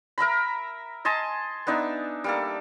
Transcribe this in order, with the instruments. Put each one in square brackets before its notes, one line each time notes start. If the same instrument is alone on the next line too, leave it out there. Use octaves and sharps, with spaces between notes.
[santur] A#4 E5 A#5 B5
D#5 G#5 A5 C6
B3 D4 D#4 E5
G3 A#3 A4